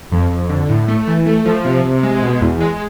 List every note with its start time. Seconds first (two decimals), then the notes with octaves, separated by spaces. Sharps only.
0.12 F2
0.30 F2
0.50 D3
0.69 A2
0.88 A3
1.07 E3
1.26 A3
1.45 F3
1.65 C3
1.84 C3
2.03 G#3
2.22 B2
2.41 E2
2.60 G#3